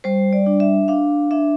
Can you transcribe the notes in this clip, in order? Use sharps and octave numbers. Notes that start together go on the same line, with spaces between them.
G3 C5
D5
D4
E5
D4 F5
D4 E5